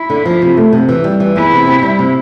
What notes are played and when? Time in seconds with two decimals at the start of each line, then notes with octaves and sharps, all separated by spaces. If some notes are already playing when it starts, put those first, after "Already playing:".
Already playing: E4
0.10 D3
0.25 F3
0.42 C3
0.57 A3
0.73 C3
0.89 E3
1.04 G3
1.20 E3
1.36 E2 E4
1.52 C3
1.67 C4
1.83 G3
1.99 C3